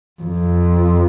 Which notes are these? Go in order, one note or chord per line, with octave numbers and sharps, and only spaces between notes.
F2